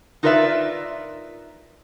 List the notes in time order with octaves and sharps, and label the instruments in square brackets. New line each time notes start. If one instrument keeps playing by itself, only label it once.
[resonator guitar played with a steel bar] D#4 F4 A#4 B4 D5 E5